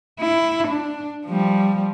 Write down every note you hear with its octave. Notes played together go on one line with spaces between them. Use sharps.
E4
D4
F3 G3